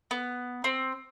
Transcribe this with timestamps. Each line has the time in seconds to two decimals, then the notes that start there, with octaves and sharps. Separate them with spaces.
0.11 B3
0.64 C4